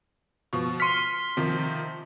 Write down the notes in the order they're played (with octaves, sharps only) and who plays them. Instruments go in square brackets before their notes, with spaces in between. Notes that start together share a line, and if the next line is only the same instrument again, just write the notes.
[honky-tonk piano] B2 F3 C#6
[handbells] C6 B6 [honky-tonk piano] F6 C#7 D#7
[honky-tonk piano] C3 D#3 F3